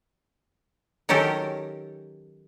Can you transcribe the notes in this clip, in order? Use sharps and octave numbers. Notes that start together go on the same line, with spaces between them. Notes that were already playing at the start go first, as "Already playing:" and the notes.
D#3 F#3 C#4 G4 A4 A#4